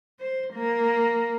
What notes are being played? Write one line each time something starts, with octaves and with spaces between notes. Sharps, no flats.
C5
A#3